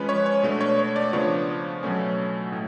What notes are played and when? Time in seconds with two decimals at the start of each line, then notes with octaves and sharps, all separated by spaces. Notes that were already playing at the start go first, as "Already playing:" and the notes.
Already playing: F3 G#3 C#4 B4
0.09 C#5
0.26 C#5
0.43 B2 A3 D4
0.61 C#5
0.79 C#5
0.96 D5
1.13 C#3 F3 B3 D4 C#5
1.83 B2 F#3 A3 C#4
2.52 A2